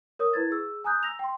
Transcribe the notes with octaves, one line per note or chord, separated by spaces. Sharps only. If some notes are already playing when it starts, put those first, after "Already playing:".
A#4 C#5 D#6 E6
E4 B4 G#6 A6
G#4 E6
G#5 A#5 D#6 F#6 G6
E6 A#6 F7
G5 C6